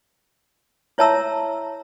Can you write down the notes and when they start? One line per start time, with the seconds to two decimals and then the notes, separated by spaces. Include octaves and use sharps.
0.98 E4 C#5 E5 A5 A#5 E6